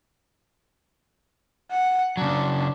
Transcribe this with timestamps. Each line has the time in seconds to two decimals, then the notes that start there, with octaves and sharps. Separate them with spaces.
1.70 F#5
2.17 C#3 F#3 D4